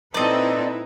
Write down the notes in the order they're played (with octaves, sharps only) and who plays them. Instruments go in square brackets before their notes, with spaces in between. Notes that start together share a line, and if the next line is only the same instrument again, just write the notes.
[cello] A#2 D#4 [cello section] C4 A4 [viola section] E4 B4 [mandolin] D5 D#5